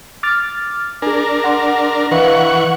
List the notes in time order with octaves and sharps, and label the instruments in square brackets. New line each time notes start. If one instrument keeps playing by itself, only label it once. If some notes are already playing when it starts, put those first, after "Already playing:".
[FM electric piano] D6 F6 A6
[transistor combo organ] D4 A#4 [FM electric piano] G#4 G#5
[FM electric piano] F#5 C6
[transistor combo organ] E3 F#5 C#6 [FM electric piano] B4 D#5 F5